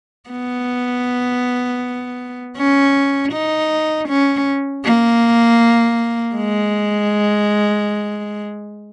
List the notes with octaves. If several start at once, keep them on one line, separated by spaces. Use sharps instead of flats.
B3
C#4
D#4
C#4
A#3
G#3